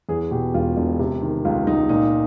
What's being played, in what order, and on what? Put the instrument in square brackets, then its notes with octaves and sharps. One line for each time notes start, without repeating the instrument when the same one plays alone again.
[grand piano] E2 G#4
B2 G4
E1 F4
E1
C3
D#3
C#2 F4
C#2 D#4
A#2 D#4